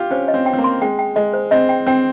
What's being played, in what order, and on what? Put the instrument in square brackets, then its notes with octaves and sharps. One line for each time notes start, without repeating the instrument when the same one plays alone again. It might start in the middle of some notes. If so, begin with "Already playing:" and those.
Already playing: [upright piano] F4 G4
[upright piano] C#4 [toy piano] C5
[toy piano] D#5
[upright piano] C4
[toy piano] G5
[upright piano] C4
A#3
[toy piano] C6
[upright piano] G#3 [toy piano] G5
[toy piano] G5
[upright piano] G#3 [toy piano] D#5
[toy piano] C5
[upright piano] C4 [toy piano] D#5
[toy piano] G5
[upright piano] C4 [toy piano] G5